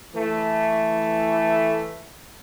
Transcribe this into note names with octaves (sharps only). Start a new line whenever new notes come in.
E3 A3